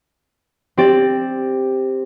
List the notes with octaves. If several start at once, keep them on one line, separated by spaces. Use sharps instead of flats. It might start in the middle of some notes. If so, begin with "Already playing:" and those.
C4 G4 D5